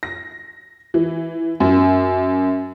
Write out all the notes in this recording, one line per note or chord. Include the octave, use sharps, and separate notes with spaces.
A#6
E3
F#2